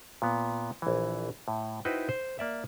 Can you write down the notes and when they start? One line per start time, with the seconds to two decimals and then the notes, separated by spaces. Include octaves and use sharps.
0.22 A#2 B3
0.82 A#1 E3
1.48 A2
1.85 D#4 E4 F#4 B4 C5 G5
2.09 C5
2.39 A#3 D5 E5